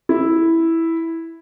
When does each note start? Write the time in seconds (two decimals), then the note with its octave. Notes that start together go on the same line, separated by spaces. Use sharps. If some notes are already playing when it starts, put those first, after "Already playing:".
0.09 E4